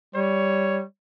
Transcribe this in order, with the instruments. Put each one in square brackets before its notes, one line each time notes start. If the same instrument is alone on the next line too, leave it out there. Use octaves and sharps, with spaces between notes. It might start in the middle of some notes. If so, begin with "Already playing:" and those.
[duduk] G3 [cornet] C#5